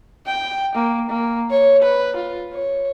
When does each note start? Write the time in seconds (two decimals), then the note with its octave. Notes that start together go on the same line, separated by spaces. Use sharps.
0.27 G5
0.75 A#3
1.10 A#3
1.51 C#5
1.83 B4
2.17 F4
2.54 C#5